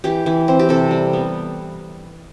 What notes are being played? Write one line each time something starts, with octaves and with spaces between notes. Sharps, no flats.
E3 G4
E3
C4
G4
C3 A4
G3
B3